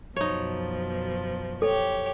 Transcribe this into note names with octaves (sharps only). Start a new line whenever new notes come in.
F#2 B2 F3 D#4 C#5
G4 A4 C#5